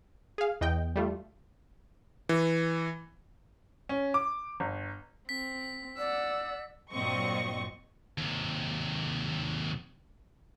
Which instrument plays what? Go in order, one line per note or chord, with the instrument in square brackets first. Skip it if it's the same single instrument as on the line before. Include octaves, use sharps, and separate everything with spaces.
[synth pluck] G#4 F5
E2 D#5 G5 G6
G3 A3 F4
[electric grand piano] E3
[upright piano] C#4
D6
G1
[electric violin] C4 [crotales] B6
[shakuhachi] D5 [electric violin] F#5 E6
[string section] G2 A#2 F#3 C4 D#5 C#6
[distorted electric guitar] D#2 C3